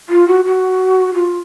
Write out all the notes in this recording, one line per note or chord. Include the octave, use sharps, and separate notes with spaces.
F4
F#4
F#4
F4